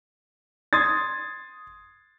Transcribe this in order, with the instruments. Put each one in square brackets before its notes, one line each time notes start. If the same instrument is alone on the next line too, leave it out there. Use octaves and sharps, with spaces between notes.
[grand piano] C6 D#6 G#6 A6